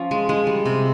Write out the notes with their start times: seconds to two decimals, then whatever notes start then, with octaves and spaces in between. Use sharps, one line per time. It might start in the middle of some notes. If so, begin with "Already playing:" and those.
Already playing: F3 C#4 F4
0.11 G#3
0.29 G#3
0.47 G3
0.66 C3